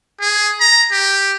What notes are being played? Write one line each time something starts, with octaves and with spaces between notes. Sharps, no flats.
G#4
A#5
G4